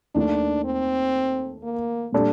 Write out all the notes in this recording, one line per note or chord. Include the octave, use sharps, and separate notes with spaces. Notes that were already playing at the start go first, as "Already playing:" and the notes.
D#2 D#3 A3 D4
C4
A#3
A#2 G3 D4 A4